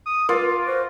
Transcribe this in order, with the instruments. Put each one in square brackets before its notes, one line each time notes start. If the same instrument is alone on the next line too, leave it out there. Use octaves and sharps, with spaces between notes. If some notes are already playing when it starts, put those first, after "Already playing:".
[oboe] D#6
[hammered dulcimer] F4 [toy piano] A#4 B4 [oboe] D6
[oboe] F#4 [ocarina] C5